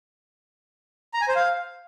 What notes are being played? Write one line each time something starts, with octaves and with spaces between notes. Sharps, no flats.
A#5
G#5
C5
F5